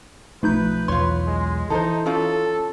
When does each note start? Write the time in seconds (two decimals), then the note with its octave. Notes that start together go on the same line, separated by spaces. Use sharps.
0.43 B1 F3 A3 D#4 B4 G6
0.88 B1 E2 F4 C#5 C6
1.27 G#3
1.70 E3 D#4 A4 C5
2.06 C#4 F4 A4